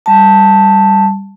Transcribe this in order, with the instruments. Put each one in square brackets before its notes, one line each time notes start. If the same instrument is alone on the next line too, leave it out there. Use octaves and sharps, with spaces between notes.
[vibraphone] G3 A5